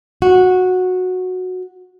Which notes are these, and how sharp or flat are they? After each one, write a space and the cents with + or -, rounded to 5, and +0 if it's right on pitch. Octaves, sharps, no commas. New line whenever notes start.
F#4 -10